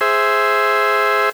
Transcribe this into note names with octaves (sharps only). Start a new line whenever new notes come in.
G#4 C5 E5